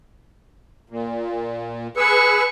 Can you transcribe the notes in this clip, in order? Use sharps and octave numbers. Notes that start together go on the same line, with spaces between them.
A#2
G#4 B4 C#6 E6